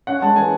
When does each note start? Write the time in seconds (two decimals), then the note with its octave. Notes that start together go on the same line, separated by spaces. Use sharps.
0.07 C#4 F#5
0.22 G#3 A5
0.36 E3 G#5